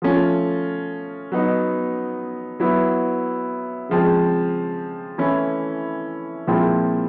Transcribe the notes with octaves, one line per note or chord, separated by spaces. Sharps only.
F3 A3 C#4 F4
F#3 B3 D#4
F#3 B3 E4
C#3 F3 G#3 C4
E3 A3 C#4 E4
A#2 F3 G#3 C4 E4